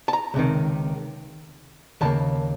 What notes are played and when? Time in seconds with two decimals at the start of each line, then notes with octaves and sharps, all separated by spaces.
0.08 A5
0.13 A#5
0.34 C#2 C3 D#3
2.01 D#2 C#3 A#3 A5